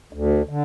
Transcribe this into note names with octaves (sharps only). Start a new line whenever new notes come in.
D2
D3